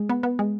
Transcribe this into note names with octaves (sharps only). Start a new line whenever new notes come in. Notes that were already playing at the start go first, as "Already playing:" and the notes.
Already playing: G#3
B3
B3
G#3